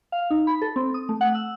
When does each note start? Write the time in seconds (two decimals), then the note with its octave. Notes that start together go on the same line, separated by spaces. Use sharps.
0.12 F5
0.30 D#4
0.47 B5
0.61 A4
0.76 C4
0.94 D#6
1.09 A3
1.21 F#5
1.35 E6